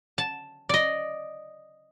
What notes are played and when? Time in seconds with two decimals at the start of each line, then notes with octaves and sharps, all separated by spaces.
0.18 A5
0.69 D5 D#5